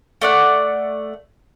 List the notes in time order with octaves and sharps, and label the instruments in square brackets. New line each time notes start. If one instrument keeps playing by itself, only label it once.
[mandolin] A3 D5 F#5